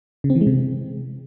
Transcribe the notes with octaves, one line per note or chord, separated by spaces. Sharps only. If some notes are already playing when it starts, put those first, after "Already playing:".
C#3
C4
E3
G#3
C3